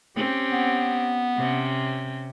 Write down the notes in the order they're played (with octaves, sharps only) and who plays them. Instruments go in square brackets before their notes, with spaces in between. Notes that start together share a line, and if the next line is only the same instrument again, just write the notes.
[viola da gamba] C4 C#4 G4
[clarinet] B3
[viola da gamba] C3 C4 C#4